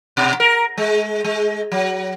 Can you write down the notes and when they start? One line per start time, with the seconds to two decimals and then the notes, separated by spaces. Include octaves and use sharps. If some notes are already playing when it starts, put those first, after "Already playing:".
0.17 B2
0.40 A#4
0.78 G#3
1.24 G#3
1.72 F#3